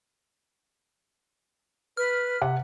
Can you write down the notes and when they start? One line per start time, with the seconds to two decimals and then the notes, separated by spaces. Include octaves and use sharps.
1.97 B4 F6
2.42 C3 F#5